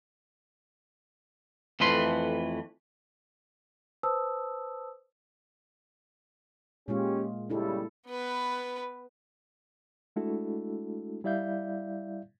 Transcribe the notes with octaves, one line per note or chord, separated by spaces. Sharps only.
F2 E3 A3 B4 C6
B4 C5 A5 D#6 E6
A#2 G#3 C#4 F4 G4
C#2 C#3 G3 D4 E4 A4
B3 B4
G#3 A3 D4 E4 F#4 A4
G3 E4 D5 E5 F5 G6